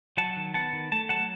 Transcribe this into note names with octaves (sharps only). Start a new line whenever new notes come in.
F#3 F#5 A5
D#3
B3 F#5 A5
D#3
A3 A5
F#3 F#5 A5